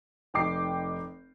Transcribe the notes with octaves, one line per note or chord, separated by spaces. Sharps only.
F1 D#4 G5 D6 C7